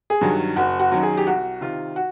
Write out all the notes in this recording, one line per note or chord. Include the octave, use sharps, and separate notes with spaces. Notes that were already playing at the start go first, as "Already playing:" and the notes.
G#4
G2 D#3 F#3
F#1 F#4
F#4
F#2 D#3 F#3
G#4
G4
C2 F#4
C3 D#3 F4
F#4